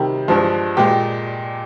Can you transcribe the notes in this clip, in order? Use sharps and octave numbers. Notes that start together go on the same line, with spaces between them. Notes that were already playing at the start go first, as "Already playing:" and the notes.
Already playing: C3 D#3 G3
G2 F3 G#3
A#2 G#3 G4